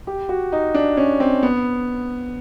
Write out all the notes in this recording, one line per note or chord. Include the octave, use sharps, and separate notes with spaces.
G4
F#4
D#4
D4
C#4
C4
B3